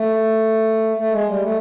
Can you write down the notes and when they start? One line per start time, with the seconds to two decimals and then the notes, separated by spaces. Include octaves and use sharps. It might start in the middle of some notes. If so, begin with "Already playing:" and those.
Already playing: A3
0.97 A3
1.11 G#3
1.27 G3
1.42 A3